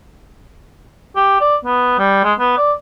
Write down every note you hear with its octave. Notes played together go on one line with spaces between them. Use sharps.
G4
D5
B3
G3
G#3
B3
D5